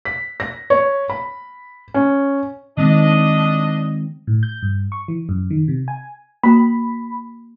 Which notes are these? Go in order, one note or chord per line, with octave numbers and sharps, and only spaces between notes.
B6
A#6
C#5
B5
C#4
D#3 G#3 C4 D4 D#5
A2
G6
G2
C#6
E3
F#2
D#3
C3
G#5
A#3 F#4 B5